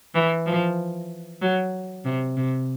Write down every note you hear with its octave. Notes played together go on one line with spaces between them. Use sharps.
E3
F3
F#3
C3
C3